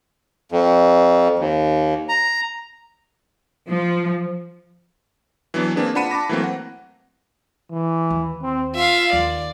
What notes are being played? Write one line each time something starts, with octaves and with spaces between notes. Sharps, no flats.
F2
D#2
A#5
F3
E3 F#3 B3 D4
A#3 C4 D4 G#4 B4
D4 F4 F#5 B5 C#7 D#7
A5 B5 D6 A#6
E3 F#3 A3 A#3 C4
F#5
E3
D#2
C4
F4 E5 F5
D#2 D5